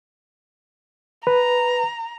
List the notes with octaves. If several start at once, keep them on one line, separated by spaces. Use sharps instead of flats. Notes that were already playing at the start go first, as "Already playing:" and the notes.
B4 A#5